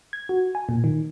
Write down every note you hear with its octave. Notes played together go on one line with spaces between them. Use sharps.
G#6
F#4
G#5
A#2
D#3